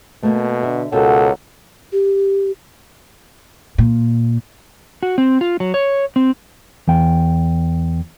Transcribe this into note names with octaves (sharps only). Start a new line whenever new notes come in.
B2 A3 A#3
D3 E5
C#2 B2 F4 A4 A#4 C#5 F#5 G5
G4
A#2
F#4
C4
F4
F#3
C#5
C4
E2 G5